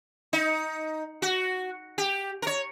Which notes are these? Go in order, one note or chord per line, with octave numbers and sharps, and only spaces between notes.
D#4
F#4
G4
A#4 C#5